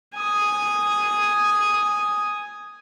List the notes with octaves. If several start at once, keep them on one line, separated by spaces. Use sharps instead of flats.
G#5 D#6